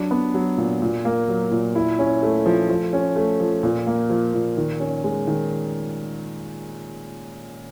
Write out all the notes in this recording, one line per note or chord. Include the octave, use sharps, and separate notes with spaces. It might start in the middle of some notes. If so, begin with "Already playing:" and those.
Already playing: F#3 D4
B3
F#3
A#2
A#2
A#3
F#3
A#2
E4
C#4
A3
F3
F3
C#4
A3
F3
A#2
A#3
F3
A#2
D#3
C#4
G#3
D#3